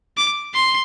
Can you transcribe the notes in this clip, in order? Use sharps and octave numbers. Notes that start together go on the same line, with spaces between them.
D6
C6